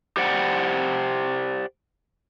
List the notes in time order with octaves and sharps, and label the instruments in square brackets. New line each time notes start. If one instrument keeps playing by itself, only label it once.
[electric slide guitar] G4 C5 D5 F#5 G5